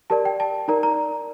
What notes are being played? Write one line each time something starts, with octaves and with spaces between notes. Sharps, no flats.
G4 A#4 D5 A5
G5
A5
D#4 A#4 D5 A#5
A#5